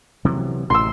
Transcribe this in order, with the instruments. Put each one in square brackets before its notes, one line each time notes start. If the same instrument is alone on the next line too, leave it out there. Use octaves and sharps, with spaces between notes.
[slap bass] C3 E3 F#3
[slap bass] A1 A2 C3 [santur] C6 E6